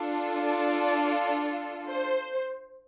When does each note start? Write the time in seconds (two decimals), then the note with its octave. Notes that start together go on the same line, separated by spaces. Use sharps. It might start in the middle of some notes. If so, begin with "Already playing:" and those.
Already playing: D4 F4 A4
0.42 D5
1.88 C5